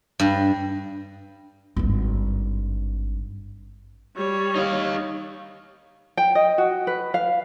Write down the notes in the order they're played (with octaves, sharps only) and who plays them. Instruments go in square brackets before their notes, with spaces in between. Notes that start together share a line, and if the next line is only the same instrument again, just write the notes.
[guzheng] G2
[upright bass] G#1 G2
[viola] G3 C#5
[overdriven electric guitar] D#4 F5
[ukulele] G5
D#5
F#4
B4
F5